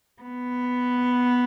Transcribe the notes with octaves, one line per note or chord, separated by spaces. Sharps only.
B3